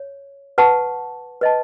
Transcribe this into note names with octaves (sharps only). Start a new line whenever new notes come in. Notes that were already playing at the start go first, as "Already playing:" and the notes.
Already playing: C#5
B4 F#5 A5 C#6
B4 D#5 A5